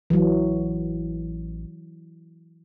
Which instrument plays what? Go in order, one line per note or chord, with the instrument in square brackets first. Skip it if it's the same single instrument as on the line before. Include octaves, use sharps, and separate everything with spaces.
[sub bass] A1 [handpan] E3 F#3